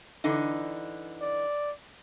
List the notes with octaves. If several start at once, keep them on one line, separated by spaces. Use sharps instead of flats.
D3 E3 D#4
D5